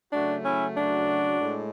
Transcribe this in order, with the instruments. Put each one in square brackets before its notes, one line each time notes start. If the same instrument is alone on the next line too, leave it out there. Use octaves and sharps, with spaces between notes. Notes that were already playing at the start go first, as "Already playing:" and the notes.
[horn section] C#3 F#3 A3 D4 F#4
C#4 E4
D4 F#4
A2 G#3